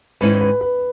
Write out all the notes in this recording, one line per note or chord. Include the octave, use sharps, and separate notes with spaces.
G#2 D#3 G#3 C#4 E4 B4
B4
B4